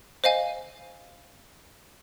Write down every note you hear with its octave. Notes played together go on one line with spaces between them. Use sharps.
C5 D#5 F5 G#5